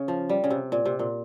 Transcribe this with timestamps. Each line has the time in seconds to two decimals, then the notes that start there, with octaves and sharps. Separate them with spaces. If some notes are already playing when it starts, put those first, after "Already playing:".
Already playing: C#3
0.08 F3
0.29 G3
0.44 C#3
0.50 C3
0.72 A#2
0.85 C3
0.99 A#2